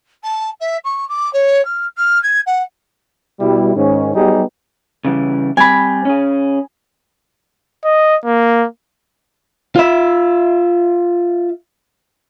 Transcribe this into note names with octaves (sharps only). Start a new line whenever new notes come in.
A5
E5
C#6
D6
C#5
F6
F6
G#6
F#5
B2 G3 E4
G#2 D#3 C#4
F#3 G3 B3 D#4 G4 G#4
C#3 E3 G3
G3 C4 G#5 B5
C#4 G#4
D#5
A#3
F4 E5